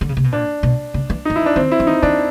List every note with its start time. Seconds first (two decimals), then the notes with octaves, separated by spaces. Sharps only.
0.01 D3
0.09 C#3
0.17 C3
0.24 B2
0.32 A#2 D4
0.63 B2
0.94 C#3
1.10 E3
1.25 F3 D#4
1.36 E4
1.41 E3
1.46 D4
1.56 D#3 C4
1.72 E4
1.80 F3
1.87 E3 D#4
2.02 D#3 D4